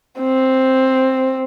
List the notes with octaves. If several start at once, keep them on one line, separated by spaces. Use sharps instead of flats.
C4